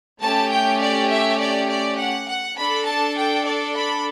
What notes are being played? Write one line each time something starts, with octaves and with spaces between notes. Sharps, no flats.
A3 C#4 G4 A5
G5
D5
E5
D5
D5
F#5
F#5
D4 A4 B5
A5
G5
D5
B5